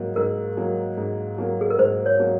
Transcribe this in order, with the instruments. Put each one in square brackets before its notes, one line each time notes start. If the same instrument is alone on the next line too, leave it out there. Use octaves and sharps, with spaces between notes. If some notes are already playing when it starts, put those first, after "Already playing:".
Already playing: [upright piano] G#2 F#3 A#3
[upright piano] G#2 [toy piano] A#4
[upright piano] F#3 A#3
G#2
F#3 A#3
[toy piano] G#4
A#4
[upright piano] G#2 [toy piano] C5
[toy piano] C#5
[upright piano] F#3 A#3